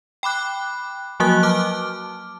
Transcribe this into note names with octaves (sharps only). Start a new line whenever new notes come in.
G5 B5 D6 F#6
F3 F#3 A#3 F#4 D#6 F#6
A5 D6 F6